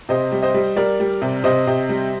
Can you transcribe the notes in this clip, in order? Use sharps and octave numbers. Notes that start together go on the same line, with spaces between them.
C3 C5 D#5
G3
C5 D#5
G3
G3 A#4 D5
G3
C3
C3 C5 D#5
C3
G3